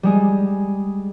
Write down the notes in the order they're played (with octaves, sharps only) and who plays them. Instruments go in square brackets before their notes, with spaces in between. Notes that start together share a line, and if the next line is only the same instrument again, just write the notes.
[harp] G3 G#3 G#4